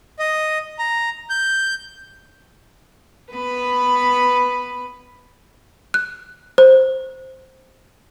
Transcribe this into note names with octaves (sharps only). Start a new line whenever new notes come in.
D#5
A#5
G6
B3 B4 B5
F#6
C5